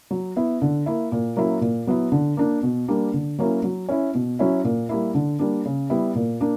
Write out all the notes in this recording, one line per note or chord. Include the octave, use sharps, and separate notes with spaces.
F#3
B3 E4
D3
A#3 E4
A#2
F#3 A#3 C#4 E4
A#2
F#3 B3 E4
D3
A#3 D4
B2
G3 A#3 D4
D3
F#3 A#3 C#4 E4
F#3
C#4 E4
B2
F#3 C#4 E4
A#2
G3 A#3 E4
D3
G3 A#3 D4
C#3
G3 B3 E4
A#2
A#3 D4